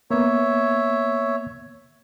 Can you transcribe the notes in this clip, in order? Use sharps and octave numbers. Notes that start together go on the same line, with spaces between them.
A#3 B3 C#5 E5